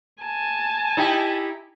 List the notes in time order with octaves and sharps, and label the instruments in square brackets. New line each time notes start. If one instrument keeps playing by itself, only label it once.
[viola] G#5 A5
[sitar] D#4 E4 G4